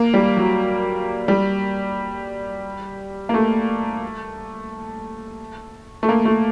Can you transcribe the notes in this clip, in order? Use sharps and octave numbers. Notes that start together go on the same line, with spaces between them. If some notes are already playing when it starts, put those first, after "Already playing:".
Already playing: A#3
G3
F#3
G3
A#3
A3
A3
A#3
A3